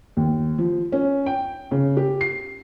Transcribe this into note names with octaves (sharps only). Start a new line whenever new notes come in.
D#2
F3
C#4
G5
C#3
G4
C7